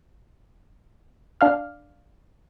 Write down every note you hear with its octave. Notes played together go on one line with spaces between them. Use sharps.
D4 F5 F6